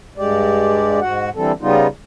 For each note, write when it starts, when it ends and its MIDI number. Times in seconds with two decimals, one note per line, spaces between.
0.18 1.00 43
0.18 1.00 56
0.18 1.00 67
0.18 1.00 74
1.01 1.29 44
1.01 1.29 66
1.01 1.29 78
1.36 1.52 50
1.36 1.52 52
1.36 1.52 55
1.36 1.52 60
1.36 1.52 69
1.61 1.87 49
1.61 1.87 55
1.61 1.87 59
1.61 1.87 63
1.61 1.87 65